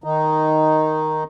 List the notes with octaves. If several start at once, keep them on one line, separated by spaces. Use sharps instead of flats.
D#3 D#4